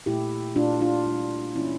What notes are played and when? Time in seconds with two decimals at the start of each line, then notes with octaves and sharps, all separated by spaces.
0.06 A#2 A3 E4 G4
0.56 A#2 A3 D4 F4
0.81 D4 F4
1.06 A#2 G3 A#3
1.55 E3 A#3 C#4 E4